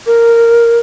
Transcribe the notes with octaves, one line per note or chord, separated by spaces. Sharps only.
A#4